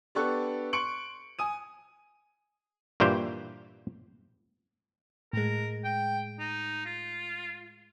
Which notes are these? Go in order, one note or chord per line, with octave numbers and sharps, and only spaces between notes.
B3 D4 G4 A4 C#6 F#6
C6 C#6 C#7 D7 F#7
G#5 D#6 D#7
G2 A#2 E3 G4 C5
A2 G#3 A#4
G5
D#4
F4